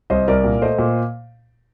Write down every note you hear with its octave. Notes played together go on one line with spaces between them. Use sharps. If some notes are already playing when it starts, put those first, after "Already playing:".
C2 C5 D#5
C2 A#4 D5
A#2
A3 C5 D#5
A#2